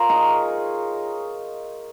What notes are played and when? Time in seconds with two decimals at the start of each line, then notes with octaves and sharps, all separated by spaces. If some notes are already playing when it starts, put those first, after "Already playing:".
Already playing: F4 A#4 C#5
0.09 D#4 G#4